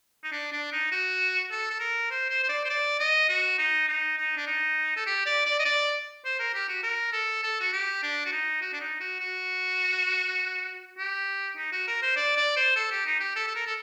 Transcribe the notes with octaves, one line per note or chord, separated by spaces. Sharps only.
D#4
D4
D4
D#4
F#4
A4
A4
A#4
C5
C5
C5
D5
C5
D5
D#5
F#4
D#4
D#4
D#4
D4
D#4
A4
G4
D5
D5
D#5
D5
C5
A#4
G4
F#4
A#4
A4
A4
F#4
G4
D4
F#4
D#4
F#4
D4
D#4
F#4
F#4
G4
D#4
F#4
A#4
C5
D5
D5
C5
A4
G4
D#4
G4
A4
A4
A#4
A4